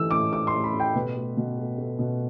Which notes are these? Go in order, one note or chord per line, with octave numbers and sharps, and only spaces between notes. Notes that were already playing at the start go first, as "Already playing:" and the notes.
Already playing: E3 A3 E6
A2 D6
A2 D6
C6
A2
B5
A3
G5
B2 B4
A3
B2
A3
A3
B2